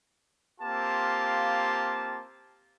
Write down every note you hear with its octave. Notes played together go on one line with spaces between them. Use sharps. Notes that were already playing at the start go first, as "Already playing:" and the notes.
A#3 C4 F4 G4 F5 A5